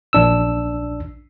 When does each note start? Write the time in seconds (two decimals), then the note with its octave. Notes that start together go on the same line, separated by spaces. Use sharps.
0.13 A#1 D4 E6